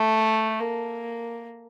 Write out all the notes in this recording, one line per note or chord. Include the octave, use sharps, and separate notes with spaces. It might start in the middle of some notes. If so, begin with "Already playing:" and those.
Already playing: A3
A#3